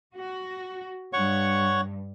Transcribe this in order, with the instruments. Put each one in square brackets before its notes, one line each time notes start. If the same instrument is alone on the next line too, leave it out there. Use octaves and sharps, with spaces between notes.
[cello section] F#4
[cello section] G2 [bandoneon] C#5 F#5 C#6